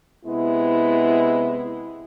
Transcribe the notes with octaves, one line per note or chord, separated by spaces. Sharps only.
C3 G#3 B3 E4